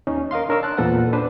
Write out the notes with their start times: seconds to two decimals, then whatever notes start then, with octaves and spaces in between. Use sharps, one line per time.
0.07 D#2 C#4 D#4
0.31 A#4 D#5 F5 C6
0.49 D4 A#4 C#5 E6
0.63 A5 F#6
0.77 E2 A#2 A4 B4 C5 F#5
1.13 D4 B4 C5